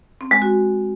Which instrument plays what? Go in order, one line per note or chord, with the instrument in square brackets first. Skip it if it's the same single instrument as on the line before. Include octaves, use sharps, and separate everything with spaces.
[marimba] C4
G#3
F#4